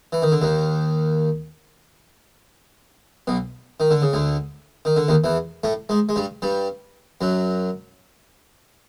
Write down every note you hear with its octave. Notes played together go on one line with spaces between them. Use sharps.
E3
D#3
D3
D#2 D#3
B1 B2
D#3
D3
C#3
D2 D3
D#3
D3
D#2 D#3
E2 E3
A2 A3
G#2 G#3
G#3
G2 G3
G2 G3
F#2 F#3